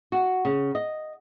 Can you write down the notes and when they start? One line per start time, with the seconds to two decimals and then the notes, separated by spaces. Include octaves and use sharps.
0.12 F#4
0.45 C#3
0.75 D#5